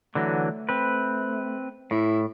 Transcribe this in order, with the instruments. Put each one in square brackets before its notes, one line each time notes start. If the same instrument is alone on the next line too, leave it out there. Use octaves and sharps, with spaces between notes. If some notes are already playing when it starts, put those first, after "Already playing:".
[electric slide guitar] D3 E3 F#3 [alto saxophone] A3
[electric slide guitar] C4 B4
[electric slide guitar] A2 [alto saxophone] E4